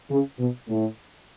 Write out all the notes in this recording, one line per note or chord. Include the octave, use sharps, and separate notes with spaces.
C#3
B2
A2